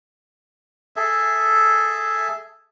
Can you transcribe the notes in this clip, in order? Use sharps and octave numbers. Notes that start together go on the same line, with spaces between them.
G#4 A4 E5